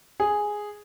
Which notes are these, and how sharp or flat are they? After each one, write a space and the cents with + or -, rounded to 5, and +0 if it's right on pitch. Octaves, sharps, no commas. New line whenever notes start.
G#4 +0